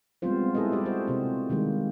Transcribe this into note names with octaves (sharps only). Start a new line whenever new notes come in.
G3 G#3 B3 C4 F4 C5
G3 E4 G#4 A4 B4 D#5
G4 D5
F#4 G4 C5
C3 A#3 C4
C3 D#3 G3 G#3 A#3